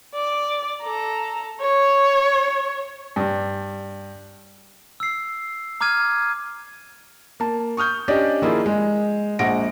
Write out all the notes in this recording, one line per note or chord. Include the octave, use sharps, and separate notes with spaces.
D5
A4 A#5
C#5
G2
E6 C7
A#5 D6 F6 G#6 D#7
A#3 A5
C#6 D#6 F6 G6
C#4 D4 G4 D5 D#5
D#3 F3 A#3 E4 F4 G#4
G#3
A#1 G#3 F#5 A#6 D7